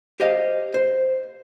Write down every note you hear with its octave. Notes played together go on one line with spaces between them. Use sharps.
G4 C5 D#5 F5
C5